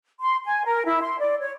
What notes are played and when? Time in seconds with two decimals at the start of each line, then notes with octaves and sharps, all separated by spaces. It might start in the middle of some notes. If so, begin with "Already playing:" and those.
0.20 C6
0.46 G#5
0.66 A#4
0.85 E4
1.02 C6
1.19 D5
1.41 C#5